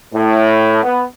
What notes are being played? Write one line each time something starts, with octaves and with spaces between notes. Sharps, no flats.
A2
B3